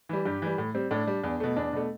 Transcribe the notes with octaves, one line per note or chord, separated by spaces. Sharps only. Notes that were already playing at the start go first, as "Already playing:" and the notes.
E3 G3
G2 G4
E3 G3
A2
G3 C4
A2 D4
G3
E2
B2 A3
E2 D4
B2 A3